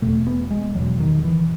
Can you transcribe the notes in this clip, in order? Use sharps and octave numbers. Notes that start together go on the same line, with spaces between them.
E2 B2 A3
B3
G#3
E2 B2 F#3
D#3
E3